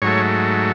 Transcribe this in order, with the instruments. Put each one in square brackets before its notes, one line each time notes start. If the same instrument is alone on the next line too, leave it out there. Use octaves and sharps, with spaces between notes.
[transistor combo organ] G#2 F#3 A3 C#5